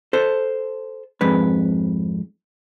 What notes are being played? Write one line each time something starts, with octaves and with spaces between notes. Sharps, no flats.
A4 C5
F2 G#2 B4